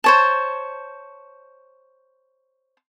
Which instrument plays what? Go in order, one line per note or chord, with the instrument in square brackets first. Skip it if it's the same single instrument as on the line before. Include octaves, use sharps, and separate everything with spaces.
[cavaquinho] C5 C#5 A5